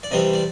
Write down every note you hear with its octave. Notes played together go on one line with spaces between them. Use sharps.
D5
C3 E3 G3 C4 D#5
D5